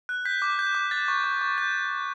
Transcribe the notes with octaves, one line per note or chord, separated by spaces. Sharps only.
F#6
G6 B6
D6
G6
D6
F#6 A6
C#6
C#6
C#6
G6